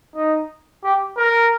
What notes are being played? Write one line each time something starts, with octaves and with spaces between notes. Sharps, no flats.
D#4
G4
A#4